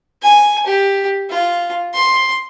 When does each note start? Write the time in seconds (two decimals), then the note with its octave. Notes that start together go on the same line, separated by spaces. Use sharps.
0.22 G#5
0.66 G4
1.30 F4
1.94 C6